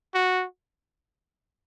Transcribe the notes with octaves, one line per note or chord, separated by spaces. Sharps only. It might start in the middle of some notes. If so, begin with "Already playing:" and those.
F#4